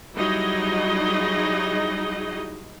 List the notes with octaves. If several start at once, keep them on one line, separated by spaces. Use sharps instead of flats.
F#3 G3 D#4 E4 G#4 D#5